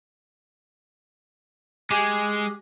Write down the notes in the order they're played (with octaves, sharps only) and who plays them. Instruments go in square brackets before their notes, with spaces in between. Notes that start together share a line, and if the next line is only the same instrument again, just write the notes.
[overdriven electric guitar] G#3 [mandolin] G4 G#4